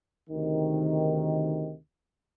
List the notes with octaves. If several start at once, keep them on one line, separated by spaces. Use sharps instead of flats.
D2 C3 D#3